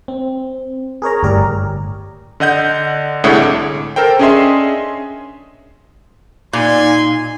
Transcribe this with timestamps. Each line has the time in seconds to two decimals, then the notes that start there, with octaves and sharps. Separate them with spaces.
0.08 C4
1.02 G#4 A#4 C#5 A#5
1.23 G1 A2 G4 A#4 D5
2.40 D3 D#5 F#5 G6
3.24 C2 A2 D3 G#3 C#5 F#5
3.42 D6
3.96 A4 A#4 C5 G5
4.19 C#4 D4 G#4 D#5 E5 C6
6.53 A#2 D#4 G#5 C6